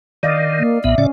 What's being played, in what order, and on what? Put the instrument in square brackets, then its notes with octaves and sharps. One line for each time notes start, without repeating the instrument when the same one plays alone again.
[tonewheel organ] D#3 [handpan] D5 D#5 F5
[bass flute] A#3
[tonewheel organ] B1 A#2 B3 [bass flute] E5
[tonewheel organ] A2 C#3 D5 [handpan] C#4